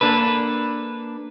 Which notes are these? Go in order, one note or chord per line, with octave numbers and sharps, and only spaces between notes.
A#3 D4 A4 B4